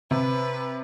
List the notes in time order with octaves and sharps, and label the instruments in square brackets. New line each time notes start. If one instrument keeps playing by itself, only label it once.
[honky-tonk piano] C3 [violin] B4